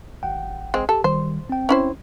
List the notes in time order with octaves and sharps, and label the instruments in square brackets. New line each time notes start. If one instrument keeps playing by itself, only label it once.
[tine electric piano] G#1 F#5 G5
[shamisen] G#3 C4
[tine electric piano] G4 [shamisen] A4
[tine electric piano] D#3 G3 [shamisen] C5
[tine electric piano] C4 G5
[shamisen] C#4 E4 C5